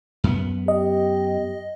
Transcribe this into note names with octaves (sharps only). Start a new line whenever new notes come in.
F#2 B3
G4 D#5